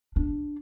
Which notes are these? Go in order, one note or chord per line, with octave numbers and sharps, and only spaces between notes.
D4